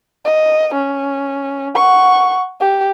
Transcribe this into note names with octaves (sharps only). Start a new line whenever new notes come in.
D#5
C#4
F#5 C#6
G4